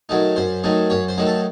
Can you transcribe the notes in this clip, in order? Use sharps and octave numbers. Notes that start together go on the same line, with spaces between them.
D#3 F#3 A3 D#4
F#2 C5
D#3 F#3 A3 D#4
F#2 C#5
C5
D#3 F#3 A3 D#4
A4